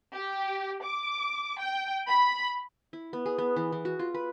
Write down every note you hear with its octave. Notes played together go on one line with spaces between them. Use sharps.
G4
D6
G5
B5
E4
B3
G#4
B3
E3
E3
F#4
F4
B4